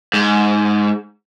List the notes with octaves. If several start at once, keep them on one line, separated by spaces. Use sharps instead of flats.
G#2